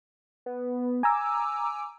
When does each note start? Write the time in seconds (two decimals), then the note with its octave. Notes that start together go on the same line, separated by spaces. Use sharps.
0.46 B3
1.03 G#5 A#5 D6 E6